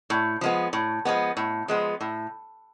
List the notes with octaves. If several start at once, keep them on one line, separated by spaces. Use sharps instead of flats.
A2
F3 G#3 B3
A2
F3 G#3 B3
A2
F3 G#3 B3
A2